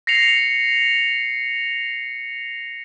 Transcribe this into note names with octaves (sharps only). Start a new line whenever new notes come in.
A#6 C7 C#7 F7